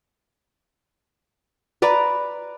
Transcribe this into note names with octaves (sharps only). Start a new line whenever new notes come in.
B4 D5 A#5 B5